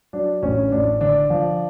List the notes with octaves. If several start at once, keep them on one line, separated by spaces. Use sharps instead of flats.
F#3 D4
A1 C#4
A1 D4
D3 D4
F3